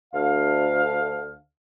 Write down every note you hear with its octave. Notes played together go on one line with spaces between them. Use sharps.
D2 F5